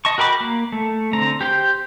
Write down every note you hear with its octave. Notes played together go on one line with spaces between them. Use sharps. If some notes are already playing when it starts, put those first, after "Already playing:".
D#5 A5 C#6
F#4 A#4 G5 B5 D6
A#3
A3
D3 C4 A#5
G4 C5 G5